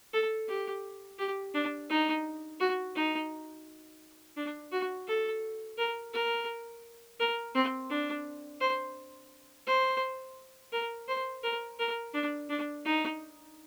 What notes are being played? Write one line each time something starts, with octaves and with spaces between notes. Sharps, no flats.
A4
G4
G4
D4
D#4
F#4
D#4
D4
F#4
A4
A#4
A#4
A#4
C4
D4
C5
C5
A#4
C5
A#4
A#4
D4
D4
D#4